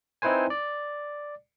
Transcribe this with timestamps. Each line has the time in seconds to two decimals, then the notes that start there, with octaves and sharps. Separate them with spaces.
0.22 C4 D#4 E4 B4 C5 G#5
0.50 D5